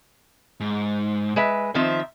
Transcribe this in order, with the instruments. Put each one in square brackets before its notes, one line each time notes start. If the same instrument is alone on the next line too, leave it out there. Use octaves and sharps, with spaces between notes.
[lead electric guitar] G#2
[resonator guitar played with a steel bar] G#3 B4 E5
[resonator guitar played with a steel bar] D#3 F3 C4 [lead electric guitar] E5